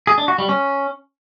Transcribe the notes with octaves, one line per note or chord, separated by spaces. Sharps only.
G#4
D4
F#4
G3
C#4